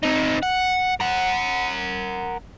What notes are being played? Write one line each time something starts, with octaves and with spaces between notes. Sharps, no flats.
C4 D#4
F#5
A#4 F#5